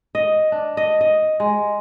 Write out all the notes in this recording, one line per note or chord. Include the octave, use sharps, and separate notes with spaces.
D#5
D4
D#5
D#5
G#3